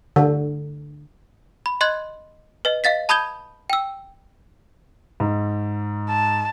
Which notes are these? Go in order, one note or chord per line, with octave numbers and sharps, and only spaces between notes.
D3
B5
D#5 C6 F#6 G#6
B4 D#5
D#5 F5 A6 B6
A5 B5 D#6 G6 G#6 G7
G5 E6
G#2
A5